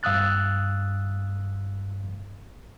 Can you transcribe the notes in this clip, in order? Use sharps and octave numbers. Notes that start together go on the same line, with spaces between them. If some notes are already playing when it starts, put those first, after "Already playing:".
G2 F5 D#6 E6 F#6 A6